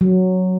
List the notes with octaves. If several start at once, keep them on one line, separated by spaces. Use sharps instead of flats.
F#3